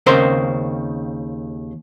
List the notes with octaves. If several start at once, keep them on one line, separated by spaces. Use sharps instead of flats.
D#2 C#3 C4 A#4 C5 C6